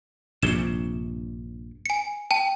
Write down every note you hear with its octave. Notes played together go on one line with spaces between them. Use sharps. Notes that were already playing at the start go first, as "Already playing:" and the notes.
A#1 G2 C3 E7 G7
G#5 C#7
G5 A5